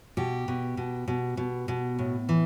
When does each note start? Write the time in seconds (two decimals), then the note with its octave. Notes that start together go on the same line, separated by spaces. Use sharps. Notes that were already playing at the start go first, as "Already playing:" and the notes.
0.17 B2 G4
0.48 B2
0.77 B2
1.08 B2
1.37 B2
1.68 B2
1.99 A2
2.29 E3